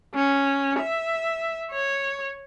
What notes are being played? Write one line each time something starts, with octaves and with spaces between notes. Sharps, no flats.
C#4
E5
C#5